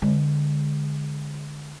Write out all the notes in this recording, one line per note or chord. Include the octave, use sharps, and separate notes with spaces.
D3 G#3